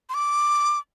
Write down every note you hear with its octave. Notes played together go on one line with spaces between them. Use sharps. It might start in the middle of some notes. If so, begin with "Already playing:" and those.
C6
D6